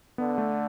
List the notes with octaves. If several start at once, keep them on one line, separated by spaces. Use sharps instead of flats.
D3 B3
A3